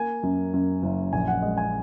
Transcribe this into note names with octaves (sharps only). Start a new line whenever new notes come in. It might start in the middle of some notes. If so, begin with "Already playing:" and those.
Already playing: A#3 G#5
F#2
F#2
F#1
A#1 G#5
F#5
G#3 D#5
G#5